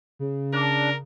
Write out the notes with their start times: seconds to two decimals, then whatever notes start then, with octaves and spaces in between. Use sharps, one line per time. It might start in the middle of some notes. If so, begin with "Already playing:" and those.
0.19 C#3
0.53 D4 A#4